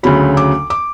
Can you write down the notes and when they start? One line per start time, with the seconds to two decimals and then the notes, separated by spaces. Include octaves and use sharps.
0.03 D2 C#3 F#3 B5
0.37 D6
0.70 D6